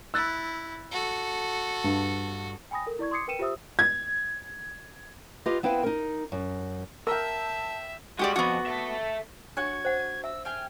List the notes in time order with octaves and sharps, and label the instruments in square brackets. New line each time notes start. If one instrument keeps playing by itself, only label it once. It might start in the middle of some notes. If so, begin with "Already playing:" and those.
[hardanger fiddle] E4 [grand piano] E6 F#6 A6
[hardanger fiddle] F#4 A4
[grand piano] G2
[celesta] G5 G#5 B5 D#6 A#6
A4 A#4
E4 D5 C#6 G#6
C6 D6 D#6 G#6 C7 C#7
A#4 B4 G5 C#7 D#7 E7
F4 G4 C5 E5 D#6 E6
[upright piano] G#6
[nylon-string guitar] F4 G4 B4 D#5
B3 C4 E4 B4 F5 G5
D#4 A#4
F#2
[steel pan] A#4 [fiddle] E5 [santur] G5 E6 [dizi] A5
[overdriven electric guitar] G3 G#3 [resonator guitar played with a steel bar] F#4 G4 D5
[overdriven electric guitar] F2 [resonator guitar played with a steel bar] B3 F#4
[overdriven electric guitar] A4 E5
[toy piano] D4 [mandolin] F#4 C#5 F#6 [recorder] G#6
[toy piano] C5 F#5
[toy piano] E5 [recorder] E6
[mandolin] G5 G#5 [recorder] F6